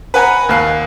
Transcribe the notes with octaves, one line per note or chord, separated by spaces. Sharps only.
B4 F#5 G#5 A#5 B5
D#2 F5 F#6 C7